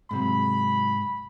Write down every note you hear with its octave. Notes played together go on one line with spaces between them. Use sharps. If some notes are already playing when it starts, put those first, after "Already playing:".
G#2 C3 F#3 B5